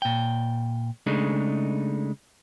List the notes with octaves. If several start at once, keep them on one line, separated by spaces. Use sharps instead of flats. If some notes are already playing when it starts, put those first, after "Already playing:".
A#2 G5
C#3 G#3 A3 D4 D#4